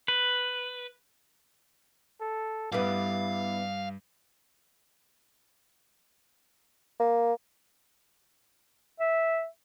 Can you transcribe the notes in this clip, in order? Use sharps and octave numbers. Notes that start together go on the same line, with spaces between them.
B4
A4
G2 G3 B3 E4 F5
A#3
E5